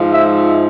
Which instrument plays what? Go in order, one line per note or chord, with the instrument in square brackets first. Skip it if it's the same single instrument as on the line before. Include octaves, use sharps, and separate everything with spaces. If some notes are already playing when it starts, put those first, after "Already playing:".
Already playing: [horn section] G#2 F3
E5